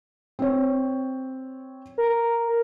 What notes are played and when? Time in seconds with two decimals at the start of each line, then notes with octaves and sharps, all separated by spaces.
0.39 C4 C#5
1.98 A#4